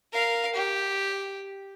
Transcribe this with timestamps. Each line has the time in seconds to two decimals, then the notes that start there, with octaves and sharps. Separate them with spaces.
0.13 A#4 F5
0.54 G4